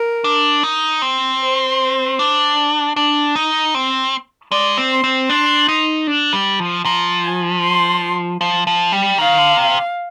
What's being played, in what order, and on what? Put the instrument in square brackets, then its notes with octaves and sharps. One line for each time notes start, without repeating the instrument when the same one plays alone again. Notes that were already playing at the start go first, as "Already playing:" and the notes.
Already playing: [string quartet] A#4
[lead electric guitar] D4
D#4
C4
[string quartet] C5
[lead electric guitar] D4
D4
D#4
C4
[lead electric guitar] G#3 [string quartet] D5
[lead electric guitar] C4
[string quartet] C6
[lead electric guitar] C4
[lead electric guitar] D4 [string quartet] C6
[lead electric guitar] D#4
D4
G3
F3
[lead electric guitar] F3 [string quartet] A#5
[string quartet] G#5
C6
[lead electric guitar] F3
F3
G3
[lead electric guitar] D#3 [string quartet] F5
[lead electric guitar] D3
C3